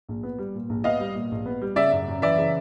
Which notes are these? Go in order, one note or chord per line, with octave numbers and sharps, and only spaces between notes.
A#1
B3
G3
A#2
A#1
B3 D#5 F5
G3
A#2
A#1
B3
G3
C#3 D5 E5
F#2
F#2
E3 D5 E5
C#3